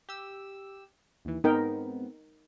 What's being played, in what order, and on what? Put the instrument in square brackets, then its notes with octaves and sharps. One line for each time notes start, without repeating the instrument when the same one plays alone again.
[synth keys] G4 E6
D#2 E3
[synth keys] G#2 B3 C4 [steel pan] D#4 A#4 G5